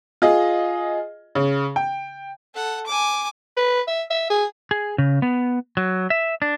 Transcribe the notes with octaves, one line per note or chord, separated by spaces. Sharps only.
F4 G#4 D#5
C#3
G5
A4 F#5
G#5 D6
B4
E5
E5
G#4
G#4
C#3
B3
F#3
E5
D4